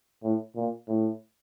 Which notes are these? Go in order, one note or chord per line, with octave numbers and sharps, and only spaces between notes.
A2
A#2
A2